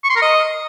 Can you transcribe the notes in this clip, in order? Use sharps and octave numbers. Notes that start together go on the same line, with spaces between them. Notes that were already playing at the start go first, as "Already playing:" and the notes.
C#6
C6
A#4
D#5